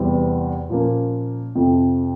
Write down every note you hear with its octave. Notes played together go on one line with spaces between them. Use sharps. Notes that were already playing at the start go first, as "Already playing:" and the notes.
Already playing: E2 C3 E3 G3 C4
A#2 F3 A#3 C#4
F2 C3 F3